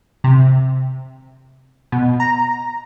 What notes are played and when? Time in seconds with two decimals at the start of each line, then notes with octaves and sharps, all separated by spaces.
0.24 C3
1.92 B2
2.20 A#5